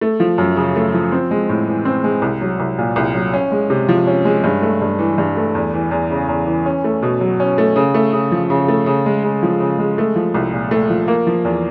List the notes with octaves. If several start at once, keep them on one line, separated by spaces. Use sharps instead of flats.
A3
F3
F#2
C#3
A3
F3
C4
G#3
A2
E3
C4
G#3
C2
F#3
C2
A#2
C2
F#3
C#4
G#3
C3
F3
C#4
G#3
G2
A3
G2
E3
G2
A3
E2
E3
E2
C#3
E2
E3
C#4
A3
B2
F#3
C#4
A3
C#3
A3
C#3
F3
C#3
A3
C#3
G#3
C#3
F3
C#3
G#3
A3
F3
C2
A#2
A3
F3
A#3
F3
E2